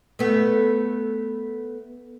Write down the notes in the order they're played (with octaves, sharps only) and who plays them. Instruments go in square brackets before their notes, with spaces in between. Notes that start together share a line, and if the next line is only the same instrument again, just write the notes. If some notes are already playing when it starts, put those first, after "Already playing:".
[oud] A3 B3